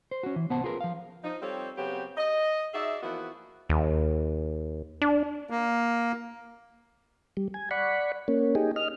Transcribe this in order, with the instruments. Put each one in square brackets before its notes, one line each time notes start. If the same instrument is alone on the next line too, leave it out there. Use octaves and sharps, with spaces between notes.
[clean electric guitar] C5
C#4 F#4
E3
C2 B3 C5 F#5 A5
F4 G#4 A#4 B4
F3 F5
[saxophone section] F3 D#4
G3 C4 F4 G4 A4 C#5
C#3 F#3 B3 C4 G4
D#5
D#4 F#4 G#4 D5 E5
E3 F3 A#3 B3 E4 F#4
[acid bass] D#2
D4
[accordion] A#3
[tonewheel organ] G3
G#5
D5 F#5 B5 C#6
A#3 C#4
D#4 G4 G#4
D#5 F6